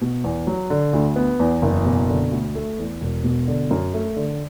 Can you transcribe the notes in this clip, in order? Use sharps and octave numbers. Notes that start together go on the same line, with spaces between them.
B2
E2
F#3
D3
D2
B3
E2
F#1
B2
D3
D2
A3
E2
E1
B2
D3
F#2
A3
D3